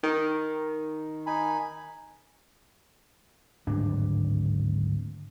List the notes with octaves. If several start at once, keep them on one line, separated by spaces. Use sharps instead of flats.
D#3
D#4 G#5 B5
D1 G#1 G2 D4